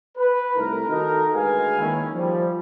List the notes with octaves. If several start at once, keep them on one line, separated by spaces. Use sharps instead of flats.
B4
C2 A3 D#4 E4 A#4
D#3 D#4 F#4 A4 A#4
D2 G#3 G#4 B4 F5 G#5
D#3 A#3 C#4 E4
F3 G3